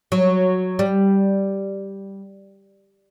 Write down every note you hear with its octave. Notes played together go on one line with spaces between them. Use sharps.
F#3
G3